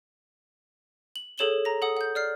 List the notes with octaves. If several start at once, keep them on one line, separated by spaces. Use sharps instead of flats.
F#7
G#4 A4 C#5 E7 F#7 G7
A#5 A#6
A4 F#5 D#6
F#5 G6
D5 F6 C7